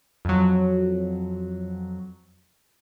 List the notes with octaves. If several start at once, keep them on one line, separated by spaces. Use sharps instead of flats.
F2 F#3